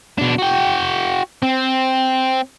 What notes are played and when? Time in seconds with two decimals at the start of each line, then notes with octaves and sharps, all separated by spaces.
0.18 B2 D4
0.38 F#4 G5
1.43 C4